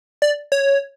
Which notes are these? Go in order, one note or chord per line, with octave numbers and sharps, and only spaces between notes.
D5
C#5